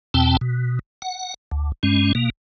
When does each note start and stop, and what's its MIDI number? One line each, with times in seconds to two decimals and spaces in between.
0.14 0.37 40
0.14 0.37 47
0.14 0.37 60
0.14 0.37 79
0.14 0.37 81
0.41 0.79 47
1.02 1.34 78
1.51 1.72 38
1.83 2.13 43
1.83 2.13 56
1.83 2.13 61
2.15 2.30 47
2.15 2.30 58